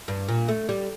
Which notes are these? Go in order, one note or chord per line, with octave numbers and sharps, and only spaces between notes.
G2
A#2
A3
G3